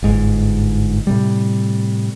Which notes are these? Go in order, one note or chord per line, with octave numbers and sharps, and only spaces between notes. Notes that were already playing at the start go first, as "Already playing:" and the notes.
G1 G#2
A2 C3 G3